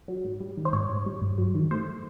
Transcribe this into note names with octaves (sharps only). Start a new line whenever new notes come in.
F#3
G#2
G3
D#3
C5
G#2 C#5
G#2
G3
G2
F#3
D#3
A3 C5